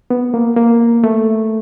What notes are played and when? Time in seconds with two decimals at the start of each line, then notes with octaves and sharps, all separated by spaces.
0.10 B3
0.34 A#3
0.57 A#3
1.04 A3